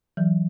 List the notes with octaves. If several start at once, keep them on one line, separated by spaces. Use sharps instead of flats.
E3 F#3